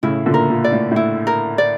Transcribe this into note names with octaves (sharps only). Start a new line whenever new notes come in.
A2 C#3 E4
A#2 D3
A#4
A#2
D5
A2
A2 E4
A#4
D5